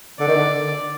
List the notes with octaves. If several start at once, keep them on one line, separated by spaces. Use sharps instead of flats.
D3 D5
D#3
D3